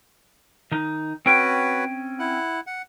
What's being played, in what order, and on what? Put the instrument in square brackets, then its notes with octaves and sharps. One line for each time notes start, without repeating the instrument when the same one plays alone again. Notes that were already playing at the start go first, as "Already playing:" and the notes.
[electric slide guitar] D#3 D#4
[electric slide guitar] C4 C#4 G5 [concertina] F#4 B4 C#5
[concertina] E4 F#5
F#5